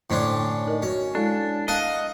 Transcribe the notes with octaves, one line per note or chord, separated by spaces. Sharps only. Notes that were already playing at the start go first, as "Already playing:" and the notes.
A2 D3 C#4 D4 C5 C6
G5
D#4 A#4 D#5
C#4 F#4 C#5
G#3 D4 E4 A4
A#4 D#5 F5 F#5 A5